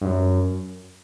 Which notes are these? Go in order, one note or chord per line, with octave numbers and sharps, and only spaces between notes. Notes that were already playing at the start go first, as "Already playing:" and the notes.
G2
F#2